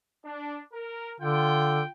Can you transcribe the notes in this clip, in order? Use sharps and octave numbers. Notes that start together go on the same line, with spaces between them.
D4
A#4
D3 F4 G5